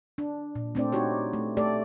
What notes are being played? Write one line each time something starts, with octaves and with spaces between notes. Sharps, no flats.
D4
A#2
A3 C4 D4 D5
D#4 F#4 G4 C#5
A3
A3 G4 A4 D5